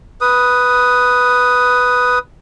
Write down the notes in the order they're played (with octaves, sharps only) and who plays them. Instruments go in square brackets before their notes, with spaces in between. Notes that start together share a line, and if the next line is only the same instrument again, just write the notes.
[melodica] B4 D#6